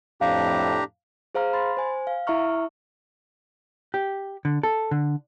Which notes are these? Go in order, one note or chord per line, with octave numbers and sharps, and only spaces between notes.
F2 A2 D4 G4 F5 A#5
G#4 C5 F5 A#5 F6
B5 C6 A6
C5 G#5
F5
E4 E5 A#5 C#6 F6
G4
D3
A4
D3